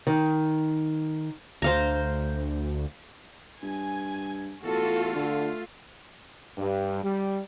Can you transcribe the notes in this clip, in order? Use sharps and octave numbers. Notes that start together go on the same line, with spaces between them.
D#3
D2 C5 F5 A#5
G2 G#5
E2 A3 F4 F#4 A4
D3
G2
G3